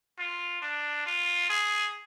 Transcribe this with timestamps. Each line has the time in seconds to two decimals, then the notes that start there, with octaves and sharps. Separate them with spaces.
0.19 F4
0.62 D4
1.06 F4
1.50 G#4